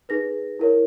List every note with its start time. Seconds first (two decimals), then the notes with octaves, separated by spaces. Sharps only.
0.09 D#4 G#4 B4 A#6
0.59 E4 A#4 C#5